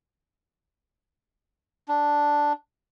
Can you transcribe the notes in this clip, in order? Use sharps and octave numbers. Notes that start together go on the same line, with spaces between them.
D4